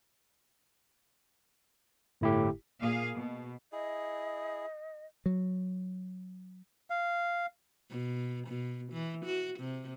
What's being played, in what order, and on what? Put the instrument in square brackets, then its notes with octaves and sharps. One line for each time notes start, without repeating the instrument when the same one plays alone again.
[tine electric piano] G1 E4 G4 [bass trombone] A2
[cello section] A#2 A#3 G#4 F5
B2
[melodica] E4 G#4 [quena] D#5
[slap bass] F#3
[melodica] F5
[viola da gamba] B2
B2
E3
F#4
C3